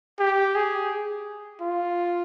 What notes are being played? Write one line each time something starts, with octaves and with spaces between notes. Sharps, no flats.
G4
G#4
F4